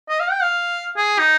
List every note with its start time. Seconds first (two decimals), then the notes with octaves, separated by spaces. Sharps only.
0.09 D#5
0.20 F5
0.31 G5
0.42 F5
0.97 G#4
1.19 D#4